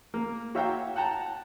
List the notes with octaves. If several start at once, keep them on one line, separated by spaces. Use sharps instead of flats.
A#3
F#4 C#5 E5 F5 G5 A#5
F#5 G5 A5 A#5